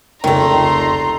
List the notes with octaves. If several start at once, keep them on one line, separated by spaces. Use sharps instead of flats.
F1 C#2 D#3 A3 A#5 C6